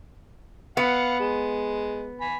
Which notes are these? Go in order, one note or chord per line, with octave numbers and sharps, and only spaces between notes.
B3 F5 F#5
G#3
G#5 B5